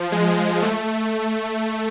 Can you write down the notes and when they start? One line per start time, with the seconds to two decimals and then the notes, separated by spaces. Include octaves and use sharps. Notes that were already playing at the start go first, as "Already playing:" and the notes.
Already playing: F3
0.12 G#3
0.62 A3